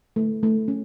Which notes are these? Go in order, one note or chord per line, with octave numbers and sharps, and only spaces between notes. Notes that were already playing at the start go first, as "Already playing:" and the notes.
A3
A3
C#4